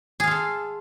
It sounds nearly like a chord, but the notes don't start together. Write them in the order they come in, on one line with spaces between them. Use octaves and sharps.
G#4 F5 F4 A4